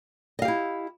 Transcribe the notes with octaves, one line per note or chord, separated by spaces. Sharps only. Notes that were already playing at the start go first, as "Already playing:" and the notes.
E4 G4 D#5 F5